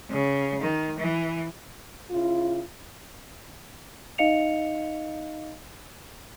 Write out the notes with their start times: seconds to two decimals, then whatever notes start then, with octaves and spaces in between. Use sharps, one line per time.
0.10 C#3
0.61 D#3
0.99 E3
2.11 C#3 E4 F4
4.18 D#4 D#5 F5 C#7 F7